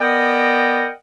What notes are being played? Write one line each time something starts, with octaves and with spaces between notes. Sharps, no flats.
B3 A#4 D5 D#5 F#5 G5